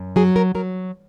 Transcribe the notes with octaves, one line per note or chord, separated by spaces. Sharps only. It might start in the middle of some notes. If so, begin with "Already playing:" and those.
Already playing: F#2
F#3 G#4
A#4
F#3 A#4